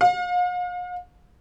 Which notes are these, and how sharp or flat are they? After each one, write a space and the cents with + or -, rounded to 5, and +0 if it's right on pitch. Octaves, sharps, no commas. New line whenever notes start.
F5 +40